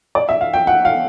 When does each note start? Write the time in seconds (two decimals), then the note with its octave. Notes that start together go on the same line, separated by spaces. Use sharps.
0.15 D5
0.29 E5
0.41 F5
0.54 G5
0.67 F#5
0.85 F5